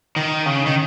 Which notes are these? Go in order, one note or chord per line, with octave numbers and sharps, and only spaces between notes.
D#3
C#3
D#3